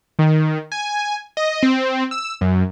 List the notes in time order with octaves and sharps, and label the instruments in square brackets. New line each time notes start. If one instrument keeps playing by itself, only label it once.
[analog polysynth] D#3
G#5
D#5
C4
E6
F#2